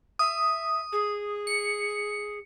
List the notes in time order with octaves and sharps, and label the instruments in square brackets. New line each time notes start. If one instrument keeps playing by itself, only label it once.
[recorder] E5 [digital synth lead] D#6
[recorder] G#4
[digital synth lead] C#7